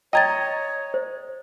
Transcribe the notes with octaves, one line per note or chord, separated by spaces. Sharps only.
C#5 D#5 G5 A#5 G#6 A6
C5